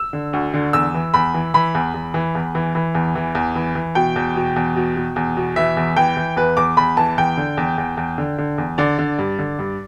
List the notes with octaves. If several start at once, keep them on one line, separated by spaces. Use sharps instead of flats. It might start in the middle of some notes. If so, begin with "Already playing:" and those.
Already playing: E6
D3
D2
D3
E2 E6
E3
E2 B5
E3
E3 B5
E2
E2
E3
E2
E3
E3
E2
E3
E2
E3
E3
B2 G5
E2
B2
E2
B2
B2
E2
B2
E3 E5
E2
E3 G5
E3
E2 B4
E2 D6
E2 B5
E3 A5
E2 G5
D3
E2
E2
E2
D3
D3
E2
D3 D5
D3
G2
D3
G2